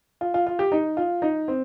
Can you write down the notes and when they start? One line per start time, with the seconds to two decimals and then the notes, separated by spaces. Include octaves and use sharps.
0.21 F4
0.34 F4
0.47 F4
0.59 G4
0.72 D#4
0.97 F4
1.22 D#4
1.48 C4